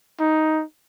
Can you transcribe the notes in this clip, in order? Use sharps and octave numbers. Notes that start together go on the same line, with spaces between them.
D#4